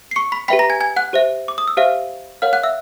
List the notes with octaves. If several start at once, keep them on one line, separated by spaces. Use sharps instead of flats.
C7
C#6 C#7
B5 B6
G4 B4 E5 G5 B5 B6
A#5 A#6
G#5 G#6
G#5 G#6
F#5 F#6
G4 C5 E5
D6
D#6
E6
G4 C5 E5 F5 F6
A#4 C#5 F5 F#5 F6
F#5 F#6
E5 E6